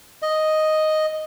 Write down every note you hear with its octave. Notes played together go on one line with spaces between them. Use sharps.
D#5